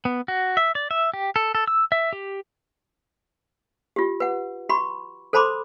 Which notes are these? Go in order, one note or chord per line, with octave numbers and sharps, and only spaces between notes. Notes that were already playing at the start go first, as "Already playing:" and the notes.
B3
F#4
E5
D5
E5
G4
A4
A4
E6
E5
G4
F4 G4
B4 F#5
F#4 B5 C#6
A4 C5 A5 B5 C6 D6